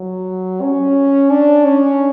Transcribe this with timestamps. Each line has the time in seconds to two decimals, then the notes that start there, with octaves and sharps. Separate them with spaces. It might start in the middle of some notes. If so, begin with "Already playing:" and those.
Already playing: F#3
0.61 C#4
1.30 D4
1.65 C#4